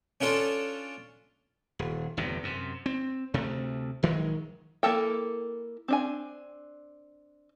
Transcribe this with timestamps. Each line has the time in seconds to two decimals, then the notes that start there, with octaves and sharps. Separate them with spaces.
0.21 C#4 D4 F4 A4
1.79 D#1
2.17 G1 E2 A2 C3
2.43 F#2 C3
2.86 C4
3.34 D2 C3 A3
4.03 A#1 D#3 F#3 G#3
4.83 A#3 E4 A4 G5
5.88 C4 D4 G#5